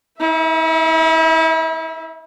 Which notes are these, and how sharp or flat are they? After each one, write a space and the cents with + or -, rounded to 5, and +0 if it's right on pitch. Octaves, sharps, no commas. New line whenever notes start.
E4 -40 E5 +0